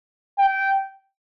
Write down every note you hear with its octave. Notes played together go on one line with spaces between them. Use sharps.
G5